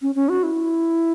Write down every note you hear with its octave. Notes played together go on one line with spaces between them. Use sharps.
C#4
C#4
F#4
E4